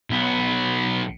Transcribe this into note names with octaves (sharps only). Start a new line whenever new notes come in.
B1 B3